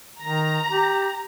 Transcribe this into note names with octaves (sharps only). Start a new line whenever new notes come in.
D#3 A#5
G4